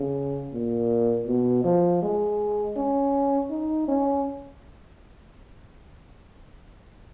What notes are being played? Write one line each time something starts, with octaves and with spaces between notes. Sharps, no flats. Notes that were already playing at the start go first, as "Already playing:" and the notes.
Already playing: C#3
A#2
B2
F3
G#3
C#4
D#4
C#4